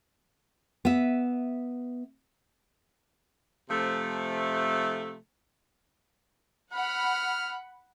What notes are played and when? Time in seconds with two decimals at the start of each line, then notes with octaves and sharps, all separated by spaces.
0.85 B3 E5
3.70 C3 F3 A3
6.73 F#5 B5 F6